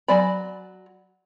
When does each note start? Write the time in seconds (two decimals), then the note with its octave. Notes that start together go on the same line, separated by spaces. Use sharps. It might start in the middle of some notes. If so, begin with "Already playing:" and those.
0.08 F#3 D5 G#5 B5